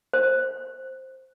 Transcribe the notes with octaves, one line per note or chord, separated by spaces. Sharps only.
C5